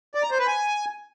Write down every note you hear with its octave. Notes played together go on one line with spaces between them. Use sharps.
D5
A#5
C5
B4
G#5